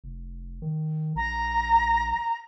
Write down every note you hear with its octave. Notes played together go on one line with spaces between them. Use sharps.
F1
D#3
A#1 A#5